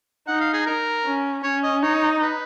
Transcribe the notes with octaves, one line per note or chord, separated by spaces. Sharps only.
D#4 F#5
F5
G#4
A#4
C#4
C#4 C#5
D#5
D#4 C#5
B4